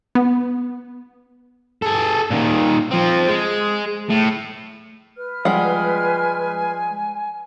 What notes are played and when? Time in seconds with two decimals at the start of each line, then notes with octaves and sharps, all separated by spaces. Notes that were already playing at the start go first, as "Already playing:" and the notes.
0.15 B3
1.82 G#4 A4
2.31 A#2 D#3
2.91 F3 C4
3.29 G#3
4.10 A2
5.17 B4 F6
5.45 F3 G3 G#3 F#5 G#5